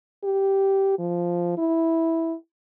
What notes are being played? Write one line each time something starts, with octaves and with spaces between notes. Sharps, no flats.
G4
F3
E4